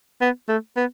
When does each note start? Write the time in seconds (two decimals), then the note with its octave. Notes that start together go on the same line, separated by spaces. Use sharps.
0.21 B3
0.48 A3
0.77 B3